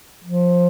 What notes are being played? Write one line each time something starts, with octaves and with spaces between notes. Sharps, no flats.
F3